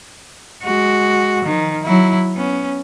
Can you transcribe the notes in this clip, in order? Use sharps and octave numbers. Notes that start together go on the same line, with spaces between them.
G#3 F#4
D#3 F3
F#3 E4
B3 C#4